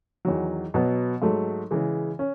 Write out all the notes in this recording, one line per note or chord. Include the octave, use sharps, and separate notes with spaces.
E2 D#3 F#3
B2 F#3 B3
G#2 F#3 A3
C#3 E3 G#3
C#4